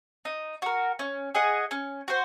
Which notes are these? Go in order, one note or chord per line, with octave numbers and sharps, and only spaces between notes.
D#4
F#4 A#4
C#4
G#4 D#5 F#5
C#4
F#4 C5